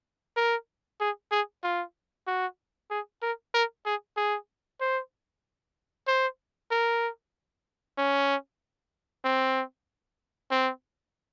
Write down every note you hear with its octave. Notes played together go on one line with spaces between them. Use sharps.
A#4
G#4
G#4
F4
F#4
G#4
A#4
A#4
G#4
G#4
C5
C5
A#4
C#4
C4
C4